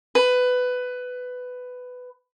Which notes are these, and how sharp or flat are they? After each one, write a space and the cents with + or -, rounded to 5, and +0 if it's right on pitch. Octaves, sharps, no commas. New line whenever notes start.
B4 +15